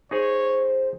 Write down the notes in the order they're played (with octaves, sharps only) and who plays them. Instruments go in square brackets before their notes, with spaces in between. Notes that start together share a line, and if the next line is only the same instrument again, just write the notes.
[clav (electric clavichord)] D#4 G#4 [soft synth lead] C5 [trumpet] C#5